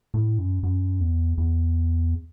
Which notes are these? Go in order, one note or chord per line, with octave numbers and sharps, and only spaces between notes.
A2
F#2
F#2
E2
E2